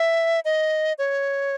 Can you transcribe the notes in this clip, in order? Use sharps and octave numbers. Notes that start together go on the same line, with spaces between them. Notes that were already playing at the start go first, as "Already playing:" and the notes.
Already playing: E5
D#5
C#5